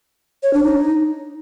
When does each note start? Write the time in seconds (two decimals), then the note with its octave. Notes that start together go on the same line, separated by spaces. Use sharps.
0.43 C#5
0.53 D4
0.64 D#4